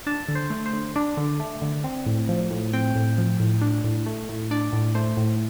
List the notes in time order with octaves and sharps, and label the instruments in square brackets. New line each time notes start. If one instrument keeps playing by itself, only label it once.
[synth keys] D4 A5
D3
C5
A3
C5
D3
D4 D5
D3
A3
D3
C4
A2
F3
A2
C4 G5
A2
F3
A2
D4
A2
A3
A2
D4 D5
A2
A3 C5
A2